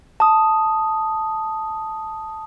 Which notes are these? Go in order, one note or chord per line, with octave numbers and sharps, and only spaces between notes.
A5 D#6